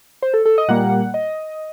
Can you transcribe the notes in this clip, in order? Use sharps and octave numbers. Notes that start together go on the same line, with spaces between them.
C5
A4
A4
D#5
A#2 G3 A#3 F#5
D#5